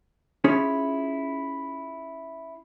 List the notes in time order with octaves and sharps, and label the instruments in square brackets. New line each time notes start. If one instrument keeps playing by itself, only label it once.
[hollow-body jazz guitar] C#4 E4 F4 G#4 C#5